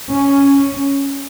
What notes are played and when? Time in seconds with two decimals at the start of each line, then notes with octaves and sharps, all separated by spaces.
0.12 C#4